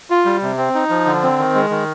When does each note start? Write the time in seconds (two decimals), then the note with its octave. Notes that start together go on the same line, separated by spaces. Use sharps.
0.10 F4
0.25 G3
0.42 C3
0.57 C4
0.74 D#4
0.89 F3
1.05 D3
1.23 C4
1.39 D#3
1.55 G#3
1.70 D#3